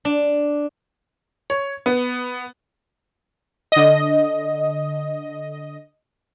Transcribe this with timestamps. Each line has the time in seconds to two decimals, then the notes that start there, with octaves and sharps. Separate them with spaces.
0.05 D4
1.50 C#5
1.86 B3
3.72 D3 D#5